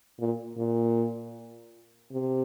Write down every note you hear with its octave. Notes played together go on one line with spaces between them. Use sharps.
A#2
A#2
C3